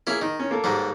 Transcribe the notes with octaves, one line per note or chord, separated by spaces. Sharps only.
A#3 C#4 E4 G#4
D#3 D#4
C#4
A#3 A4
D#2 G#2 G3